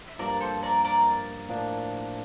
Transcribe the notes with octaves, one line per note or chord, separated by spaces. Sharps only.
E5
G2 F3 A#3 A#4 D5
A4 C5
A#4 D5
A#4 D5
A2 F3 A#3 D4